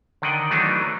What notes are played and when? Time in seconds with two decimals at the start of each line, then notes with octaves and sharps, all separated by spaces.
0.22 D3 D#3 D5 D#5 F#5 G5
0.51 E3 F#3 A3 B3 D4 D#4